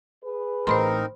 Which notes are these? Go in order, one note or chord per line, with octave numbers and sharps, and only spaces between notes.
G#4 B4
A1 C4 D#4 A#4 C5 B5 C6